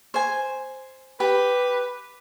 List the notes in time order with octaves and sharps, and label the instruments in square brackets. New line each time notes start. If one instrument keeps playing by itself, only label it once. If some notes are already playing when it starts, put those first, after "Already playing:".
[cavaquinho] C5 G#5
[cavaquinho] G4 [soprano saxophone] B4